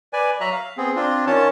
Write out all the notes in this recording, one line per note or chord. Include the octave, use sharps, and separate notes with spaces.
B4 D5 G#5
F#3 F#4 E5 A#5 F#6
F5
B3 C4 G#4
C4 D4 F4
D#3 C#4 F4 C#5 A5